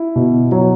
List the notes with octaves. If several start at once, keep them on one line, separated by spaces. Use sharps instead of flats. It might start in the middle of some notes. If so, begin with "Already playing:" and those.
Already playing: E4
B2
F#3